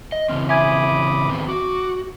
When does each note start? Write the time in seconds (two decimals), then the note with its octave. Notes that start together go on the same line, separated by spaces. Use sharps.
0.12 D#5
0.29 C#3 E3 C4 F6
0.49 E5 G#5 B5 D6 D#6 G#6
1.29 D#3 B3 C4
1.48 F#4 D6